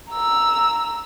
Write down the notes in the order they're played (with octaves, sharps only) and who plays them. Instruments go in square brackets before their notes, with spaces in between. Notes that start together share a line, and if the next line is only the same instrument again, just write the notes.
[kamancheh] A#5 E6